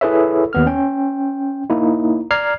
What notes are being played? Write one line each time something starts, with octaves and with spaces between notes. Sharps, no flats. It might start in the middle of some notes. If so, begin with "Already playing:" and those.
E4 G#4 A4 B4 C#5 E5
D#2 B3 F6
C#4 G5
A#3 D#4 E4
D5 A#5 F6 G#6 C7